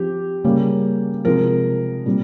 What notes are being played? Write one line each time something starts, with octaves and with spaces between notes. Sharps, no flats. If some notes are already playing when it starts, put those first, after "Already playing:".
Already playing: F3 C4 G4
C#3 G3 A#3 C#4
C3 F3 G#3 A#4
A#2 G3 C4